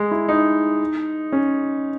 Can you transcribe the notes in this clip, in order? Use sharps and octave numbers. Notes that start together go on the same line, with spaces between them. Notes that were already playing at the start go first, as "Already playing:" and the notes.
Already playing: G#3
E4
D#4
C#4